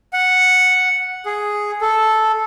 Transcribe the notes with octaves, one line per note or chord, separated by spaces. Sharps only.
F#5
G#4
A4